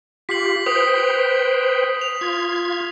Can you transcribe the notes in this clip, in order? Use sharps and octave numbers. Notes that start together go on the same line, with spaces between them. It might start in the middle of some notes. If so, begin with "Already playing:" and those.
F4 G4 B6 C7 F#7
B4 C5 G5 D#6
F7
F4 G#6